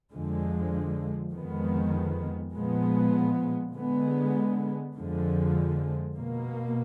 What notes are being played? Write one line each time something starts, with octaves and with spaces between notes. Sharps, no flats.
F2 D3 F3 G#3
F2 D#3 G#3 B3
A#2 F3 G#3 B3
D3 G#3 B3
F2 D3 F3 G#3
B2 A#3